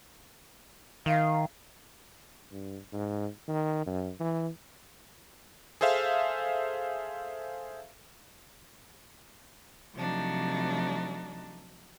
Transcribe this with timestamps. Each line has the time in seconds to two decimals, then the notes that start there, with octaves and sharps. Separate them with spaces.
1.06 D#3 F5
2.51 G2
2.93 G#2
3.48 D#3
3.87 F#2
4.20 E3
5.81 G#4 A4 C5 E5 F5
9.95 C3 F3 F#3 A3 D4 D#4